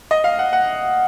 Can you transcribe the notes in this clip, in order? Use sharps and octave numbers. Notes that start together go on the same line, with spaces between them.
D#5
F5
F#5
F#5